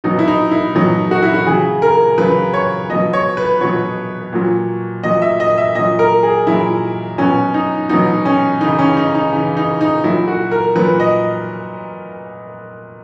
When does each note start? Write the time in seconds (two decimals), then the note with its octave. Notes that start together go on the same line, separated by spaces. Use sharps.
0.04 B2 F#3 D#4
0.19 E4
0.28 D#4
0.51 E4
0.75 B2 F#3 D#4
1.11 F#4
1.22 E4
1.34 F#4
1.46 C#3 F#3 G#4
1.82 A#4
2.18 C#3 F#3 B4
2.53 C#5
2.89 B2 F#3 D#5
3.13 C#5
3.37 B4
3.61 B2 F#3 C#5
4.33 A#2 F#3
5.04 A#2 F#3 D#5
5.22 E5
5.40 D#5
5.58 E5
5.75 A#2 F#3 D#5
5.99 A#4
6.23 G#4
6.47 A#2 F#3 E4
7.18 B2 F#3 C#4
7.54 D#4
7.89 B2 F#3 D#4
8.25 C#4
8.61 C#3 E3 D#4
8.79 C#4
8.97 D#4
9.15 D#4
9.32 C#3 E3
9.57 D#4
9.81 D#4
10.04 A#2 F#3 E4
10.28 F#4
10.51 A#4
10.76 A#2 F#3 B4
11.00 D#5